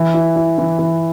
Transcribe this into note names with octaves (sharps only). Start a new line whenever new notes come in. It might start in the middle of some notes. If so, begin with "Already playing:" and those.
Already playing: E3
E4
E4
E3
E3